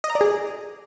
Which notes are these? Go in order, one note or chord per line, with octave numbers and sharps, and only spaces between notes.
D#5
A#5
D5
G#4